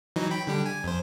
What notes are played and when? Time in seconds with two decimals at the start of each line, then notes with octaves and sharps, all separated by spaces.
0.16 E3 F#3 D#4
0.31 G5 B5
0.47 D3 G3 G4
0.66 G#5
0.84 F2 C5